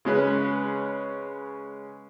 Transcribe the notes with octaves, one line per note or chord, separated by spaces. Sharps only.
C#3 G#3 C#4 B4